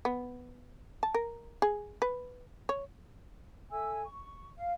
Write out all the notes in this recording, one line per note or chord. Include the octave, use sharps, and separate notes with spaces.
B3
A5
A#4
G#4
B4
C#5
A4 E5 G#5 E6
C#6
F5